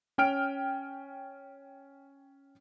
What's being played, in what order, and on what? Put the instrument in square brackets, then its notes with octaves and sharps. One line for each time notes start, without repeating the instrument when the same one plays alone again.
[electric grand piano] C#4 G5 F6 D7